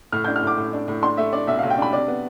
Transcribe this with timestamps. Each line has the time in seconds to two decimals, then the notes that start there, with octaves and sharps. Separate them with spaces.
0.12 A2 F6
0.24 G6
0.28 D4
0.36 F6
0.43 A2 D6
0.58 A2
0.73 D4
0.88 A2
1.03 D4 C6
1.17 A3 E5
1.33 D4 D5
1.47 B1 E5
1.59 F5
1.63 B1
1.70 G5
1.78 D4 B5
1.93 C3 D5
2.08 B3